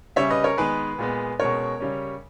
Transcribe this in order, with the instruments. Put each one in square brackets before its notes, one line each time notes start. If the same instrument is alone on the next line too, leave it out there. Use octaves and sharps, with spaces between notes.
[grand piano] C#3 G3 C#4 C#5 E5
B4 D#5
A#4 C#5
D#3 G#3 B3 G#4 B4
A#2 G#3 B3
B2 G#3 C#4 A#4 C#5
C#3 G3 C#4